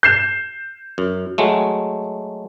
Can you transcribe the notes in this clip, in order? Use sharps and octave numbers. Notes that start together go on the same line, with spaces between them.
G6 C7 E7
F#2
F#3 G#3 A3